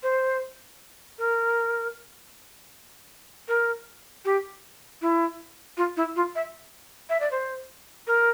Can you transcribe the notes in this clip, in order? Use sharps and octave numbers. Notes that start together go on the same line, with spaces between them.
C5
A#4
A#4
G4
E4
F4
E4
F4
E5
E5
D5
C5
A#4